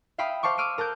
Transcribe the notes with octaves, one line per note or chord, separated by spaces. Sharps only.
E5 F5 G5 B5 D#6
C5 F5 A5 C#6 D6
D6 E6 F6 D7 D#7
A#4 A5 F#6 G6